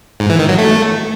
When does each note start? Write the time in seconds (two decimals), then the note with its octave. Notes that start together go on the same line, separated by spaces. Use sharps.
0.20 G#2
0.30 E3
0.39 D#3
0.49 F#3
0.58 A3